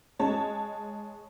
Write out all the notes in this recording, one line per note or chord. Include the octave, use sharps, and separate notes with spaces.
G#3 C#5 A5